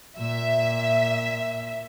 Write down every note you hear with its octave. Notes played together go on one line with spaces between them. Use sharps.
A#2 E5